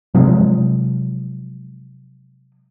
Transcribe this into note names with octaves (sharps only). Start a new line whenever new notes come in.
C3 F3 F#3 G#3